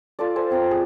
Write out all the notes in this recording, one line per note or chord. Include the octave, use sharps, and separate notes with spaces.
F4 A4 D5
A4 C5 G#5
C4 G5 A#5 C6
G#4